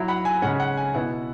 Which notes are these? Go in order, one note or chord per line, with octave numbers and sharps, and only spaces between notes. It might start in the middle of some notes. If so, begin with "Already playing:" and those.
Already playing: F#3 E4
F#5 B5
G#5
C#3 G#3 C#4 F#5
F#5
G#5
B2 B3 E4 F#5